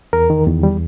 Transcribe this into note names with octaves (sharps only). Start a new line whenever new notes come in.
E2 A#4
D#3
E2
G3